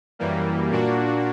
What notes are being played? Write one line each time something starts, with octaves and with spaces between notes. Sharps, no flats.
F#2 E3 G3 A#3
A#2 A#3 D4 F#4